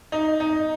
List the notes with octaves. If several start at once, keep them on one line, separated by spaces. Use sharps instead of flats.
D#4
D#4